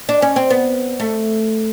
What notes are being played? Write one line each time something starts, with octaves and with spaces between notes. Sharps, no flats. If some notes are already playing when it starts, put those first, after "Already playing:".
D4
C#4
C4
B3
A3